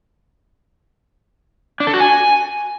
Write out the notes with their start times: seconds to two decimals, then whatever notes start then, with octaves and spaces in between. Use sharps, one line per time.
1.80 D4
1.87 A4
1.94 F#4
2.00 G#5